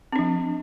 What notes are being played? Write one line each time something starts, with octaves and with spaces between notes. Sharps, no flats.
F3 C4 D4